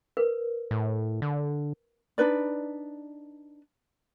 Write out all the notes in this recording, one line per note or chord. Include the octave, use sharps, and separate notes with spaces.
A#4 B4
A2
D3
D4 D#4 B4 D5